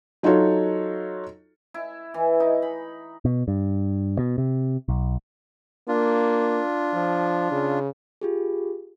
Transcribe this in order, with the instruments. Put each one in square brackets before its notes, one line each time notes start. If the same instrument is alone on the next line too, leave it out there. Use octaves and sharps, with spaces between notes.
[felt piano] F#3 D#4 F4 F#4 A4 C#5
[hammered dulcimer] E4
E3
D#4
B5
[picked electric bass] B2
G2
B2
C3
B1
[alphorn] A#3 [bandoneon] D4 F4
[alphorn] F3
C#3
[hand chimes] F4 G4 G#4